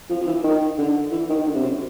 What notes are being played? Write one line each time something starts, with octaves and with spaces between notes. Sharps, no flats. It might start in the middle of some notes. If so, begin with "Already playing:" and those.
F3
F3
E3
D#3
D3
E3
D#3
D3
C3
F#2